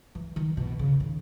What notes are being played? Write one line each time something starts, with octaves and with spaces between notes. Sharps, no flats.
E3
D#3
B2
C#3
D#3